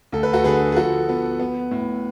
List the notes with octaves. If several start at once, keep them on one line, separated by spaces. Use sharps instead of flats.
D2 A4
B4
F#4 A4
D3 G#4 B4
G#4
F3 F#4 A4
B3
B3
A2